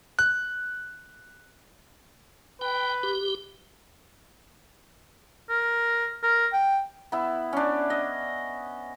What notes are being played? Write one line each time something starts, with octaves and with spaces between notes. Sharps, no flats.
F#6
B4 G5
G4
A#4
A#4
G5
B3 E4
C#4 D4
D#5